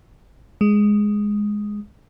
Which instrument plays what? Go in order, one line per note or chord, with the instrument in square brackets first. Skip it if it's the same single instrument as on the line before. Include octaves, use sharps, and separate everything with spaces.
[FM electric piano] G#3